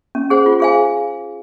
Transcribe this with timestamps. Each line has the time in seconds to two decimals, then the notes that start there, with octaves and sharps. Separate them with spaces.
0.15 C#4
0.30 G#4 C5 F#5
0.46 F4
0.60 G#4 C5 F5 G#5